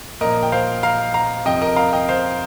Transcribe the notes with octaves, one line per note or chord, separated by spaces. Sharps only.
A#2 F3 A#4 D#5
G5
C5 F5
F5 A#5
F5 A#5
F2 C3 F3 D#5 G5
A#4 D#5
F5 A#5
D#5 G5
C5 F5